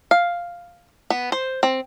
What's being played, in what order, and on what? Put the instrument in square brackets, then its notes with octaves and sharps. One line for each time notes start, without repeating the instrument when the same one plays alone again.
[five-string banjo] F5
B3
C5
C4